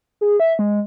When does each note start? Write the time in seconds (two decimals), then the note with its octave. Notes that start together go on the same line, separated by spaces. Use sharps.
0.21 G#4
0.40 E5
0.59 G#3